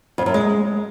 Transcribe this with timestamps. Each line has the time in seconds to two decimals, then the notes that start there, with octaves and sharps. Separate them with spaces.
0.18 F2
0.26 F#2
0.34 G#3